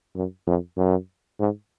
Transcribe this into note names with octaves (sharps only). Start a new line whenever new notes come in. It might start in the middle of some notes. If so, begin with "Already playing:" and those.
F#2
F2
F#2
G#2